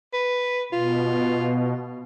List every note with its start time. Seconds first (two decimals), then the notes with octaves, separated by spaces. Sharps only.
0.13 B4
0.72 B2 F4